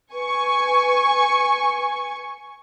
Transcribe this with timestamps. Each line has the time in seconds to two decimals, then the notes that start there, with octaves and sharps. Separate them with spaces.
0.13 B4 G#5 C#6